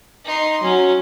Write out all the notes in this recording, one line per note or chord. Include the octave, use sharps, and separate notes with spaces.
D#4 C6
F#3 C#4